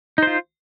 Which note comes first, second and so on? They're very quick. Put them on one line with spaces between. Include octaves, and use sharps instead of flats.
D#4 C5 F4